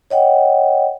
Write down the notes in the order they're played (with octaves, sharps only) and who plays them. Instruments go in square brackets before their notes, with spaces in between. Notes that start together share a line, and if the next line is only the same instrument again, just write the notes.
[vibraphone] C#5 D#5 F#5 G5